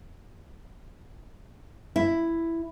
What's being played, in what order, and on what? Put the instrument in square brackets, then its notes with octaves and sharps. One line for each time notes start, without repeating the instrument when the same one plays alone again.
[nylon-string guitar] E4